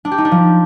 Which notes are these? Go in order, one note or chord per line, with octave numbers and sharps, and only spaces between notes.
D4
G4
D#4
D4
F3